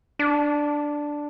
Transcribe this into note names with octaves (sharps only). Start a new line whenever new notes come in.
D4